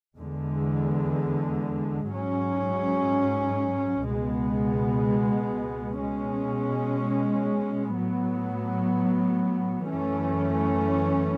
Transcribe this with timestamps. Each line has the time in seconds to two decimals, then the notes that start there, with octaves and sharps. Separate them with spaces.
0.17 E2 D3 G#3
2.11 G#2 F#3 C#4
4.06 C#2 B2 G#3 B3
6.00 B2 G#3 C#4
7.94 A2 F#3 B3
9.88 F#2 E3 A3 C#4